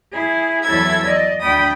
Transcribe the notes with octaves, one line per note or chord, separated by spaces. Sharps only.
E4 G#4
E2 F#3 E4 A4 E6 G#6
D5 D#5
D2 D4 G5 B5 D#6